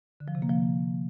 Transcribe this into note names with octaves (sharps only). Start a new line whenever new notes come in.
D3
F3
C3
A#3
F3